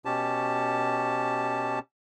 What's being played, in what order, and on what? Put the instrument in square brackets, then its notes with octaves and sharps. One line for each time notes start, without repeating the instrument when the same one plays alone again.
[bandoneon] B2 C#4 G4 A5